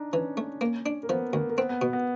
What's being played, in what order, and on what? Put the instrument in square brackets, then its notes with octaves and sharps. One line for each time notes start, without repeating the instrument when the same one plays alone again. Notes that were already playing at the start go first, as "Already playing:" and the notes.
Already playing: [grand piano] D4 D#4
[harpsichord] E3 [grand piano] C#4
[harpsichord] A3
A#3
D4
[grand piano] A#3
[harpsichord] F3 [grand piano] B3
[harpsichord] D2 [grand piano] A#3
[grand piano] A#3
[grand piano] B3 [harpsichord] C4
[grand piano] B3
[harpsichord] B2
[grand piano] B3